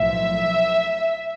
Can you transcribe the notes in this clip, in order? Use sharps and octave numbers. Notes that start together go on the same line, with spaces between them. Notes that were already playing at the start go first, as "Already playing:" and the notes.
Already playing: B1 A2 F3 E5